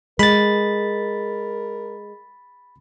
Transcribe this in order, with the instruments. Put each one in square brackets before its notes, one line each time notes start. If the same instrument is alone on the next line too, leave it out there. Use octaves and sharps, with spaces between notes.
[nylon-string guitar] G#3 [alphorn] A#4 [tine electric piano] B5 A6